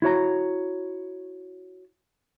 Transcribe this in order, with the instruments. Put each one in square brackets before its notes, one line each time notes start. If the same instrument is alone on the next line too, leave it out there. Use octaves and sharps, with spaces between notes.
[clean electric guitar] E4 F#4 C#5 A#5